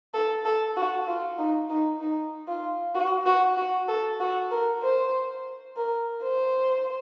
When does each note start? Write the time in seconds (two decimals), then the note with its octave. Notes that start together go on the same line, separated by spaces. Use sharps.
0.14 A4
0.45 A4
0.76 F#4
1.07 F4
1.38 D#4
1.70 D#4
2.01 D#4
2.48 F4
2.95 F#4
3.26 F#4
3.57 F#4
3.88 A4
4.20 F#4
4.51 A#4
4.83 C5
5.76 A#4
6.23 C5